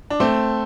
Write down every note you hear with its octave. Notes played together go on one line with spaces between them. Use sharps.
D4
A3 C4